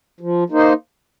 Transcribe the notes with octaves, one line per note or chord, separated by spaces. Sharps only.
F3
A#3 D#4 C5